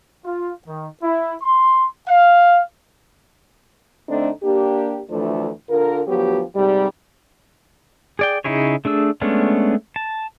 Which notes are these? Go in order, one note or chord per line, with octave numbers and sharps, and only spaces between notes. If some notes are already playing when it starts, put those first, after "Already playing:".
F4
D#3
E4
C6
F5
D3 A3 C4 D4 D#4
A#3 D4 G4
D2 E3 F3 A3 D4
D3 F4 A#4
D2 F3 F#3 B3 G4
G#2 C3 G3
G#4 D5 G5
C#3 D#4 E4 G#4 C#5
A3 D4 G#4 E6
G#3 A3 B3 C#4 D4
A5